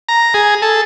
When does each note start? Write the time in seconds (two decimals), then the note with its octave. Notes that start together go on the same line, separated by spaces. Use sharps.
0.09 A#5
0.34 G#4
0.62 A4